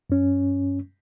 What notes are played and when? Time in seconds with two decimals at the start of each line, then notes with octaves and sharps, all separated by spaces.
0.10 F#2 C#4